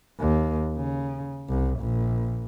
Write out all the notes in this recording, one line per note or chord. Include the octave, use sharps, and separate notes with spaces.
D#2
C#3
C2
A#1